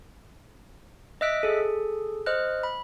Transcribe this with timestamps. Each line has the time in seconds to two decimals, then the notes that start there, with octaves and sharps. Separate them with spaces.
1.21 D#5 E5 E6 F#6 B6 D7
1.43 G#4 A4
2.26 C5 D#5 F6 F#6
2.63 B5